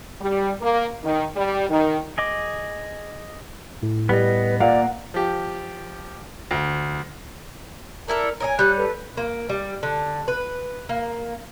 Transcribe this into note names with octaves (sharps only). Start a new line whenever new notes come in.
G3
A#3
D#3
G3
D#3
G#4 D#5 D6
A2
G3 B3 B4 D#5
A#2 A#3 D5 F5 F#5
F3 G4
D2
D4 E4 A4 A#4 A#5
A#4 C#5 D#5 G#5
G3 C#4 F#6
A4 B4
A#3
G3
D3
B4
A#3